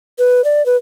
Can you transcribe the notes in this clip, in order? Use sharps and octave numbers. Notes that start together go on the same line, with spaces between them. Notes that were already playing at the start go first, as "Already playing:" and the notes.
B4
D5
B4